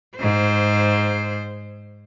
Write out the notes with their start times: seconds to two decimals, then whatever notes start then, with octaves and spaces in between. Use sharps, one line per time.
0.17 G#2 C5